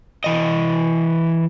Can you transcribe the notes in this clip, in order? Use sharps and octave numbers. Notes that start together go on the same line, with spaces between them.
E3 D#5